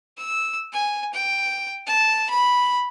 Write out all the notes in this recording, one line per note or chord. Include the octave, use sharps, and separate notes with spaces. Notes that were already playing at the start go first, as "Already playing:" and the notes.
E6
G#5
G5
A5
B5